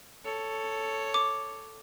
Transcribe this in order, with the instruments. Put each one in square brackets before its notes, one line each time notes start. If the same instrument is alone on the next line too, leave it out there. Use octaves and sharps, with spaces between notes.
[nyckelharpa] A4 C#5
[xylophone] D6